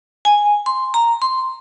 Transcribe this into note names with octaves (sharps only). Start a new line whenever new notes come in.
G#5
C6
A#5
C6